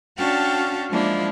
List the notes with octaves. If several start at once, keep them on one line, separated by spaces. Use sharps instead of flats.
C#4 D4 F#4 F5 G5 A5
F3 G#3 A#3 D4 E4